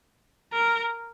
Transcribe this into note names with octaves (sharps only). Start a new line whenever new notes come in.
A#4